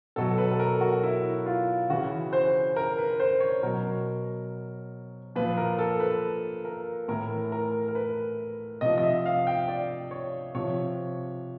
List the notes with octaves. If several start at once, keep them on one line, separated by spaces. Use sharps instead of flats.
B2 F#3 A4
B4
A4
A#4
F#4
E4
F4
C#3 E3 F#4
C5
A#4
B4
C5
C#5
B2 F#3 A#4
A#2 F3 B4
A#4
A4
B4
A#4
A2 E3 A#4
A#4
A#4
B4
C3 F3 D#5
D#5
E5
F5
G5
D5
C#5
C3 F3 C#5